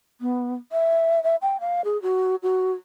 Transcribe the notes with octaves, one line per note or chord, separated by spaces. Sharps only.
B3
E5
E5
G5
F5
G#4
F#4
F#4